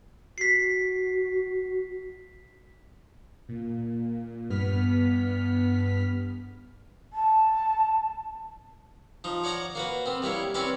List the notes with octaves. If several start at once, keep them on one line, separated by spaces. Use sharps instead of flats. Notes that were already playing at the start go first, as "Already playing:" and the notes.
F#4 B6 C7
A#2
G2 B3 F6 B6
A5
F3 D#4
C#5 D5 F#5 A#5 C#6
A#3 F#4 B4
B3 C4
G3 A#3 E4 C#5
C4 C#4 B4 C#5 D5 E5